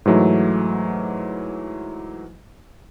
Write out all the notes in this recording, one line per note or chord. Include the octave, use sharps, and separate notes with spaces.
G#2 E3 F#3 A3